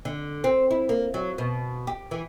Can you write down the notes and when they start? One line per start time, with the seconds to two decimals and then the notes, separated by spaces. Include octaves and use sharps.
0.05 D3
0.44 C4
0.71 E4
0.89 A#3
1.14 F#3
1.38 B2
1.87 G4
2.11 E3